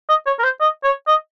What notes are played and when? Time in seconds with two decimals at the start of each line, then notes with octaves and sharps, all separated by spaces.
0.09 D#5
0.27 C#5
0.39 A#4
0.44 C5
0.61 D#5
0.84 C#5
1.07 D#5